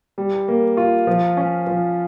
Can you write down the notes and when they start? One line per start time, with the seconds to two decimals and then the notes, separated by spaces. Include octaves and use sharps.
0.18 G3
0.48 A#3
0.77 F4
1.07 F3
1.37 C#4
1.67 F3